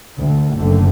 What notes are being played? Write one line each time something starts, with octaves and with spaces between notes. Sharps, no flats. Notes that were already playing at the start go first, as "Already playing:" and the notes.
D2
F#1 D3 A3